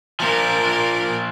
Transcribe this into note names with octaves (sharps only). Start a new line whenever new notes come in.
A#2 F3 A#4 D5